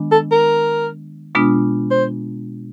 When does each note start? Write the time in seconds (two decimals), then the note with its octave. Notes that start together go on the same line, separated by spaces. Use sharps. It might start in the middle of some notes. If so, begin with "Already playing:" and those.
Already playing: D#3 G#3 B3 D4
0.12 A4
0.32 A#4
1.35 B2 G#3 B3 D4 F4
1.91 C5